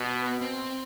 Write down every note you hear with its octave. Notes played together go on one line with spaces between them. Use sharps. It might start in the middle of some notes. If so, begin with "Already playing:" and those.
Already playing: B2 B3
C4